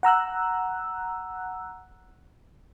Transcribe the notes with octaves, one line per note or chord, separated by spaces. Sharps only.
F#5 A#5 E6 F#6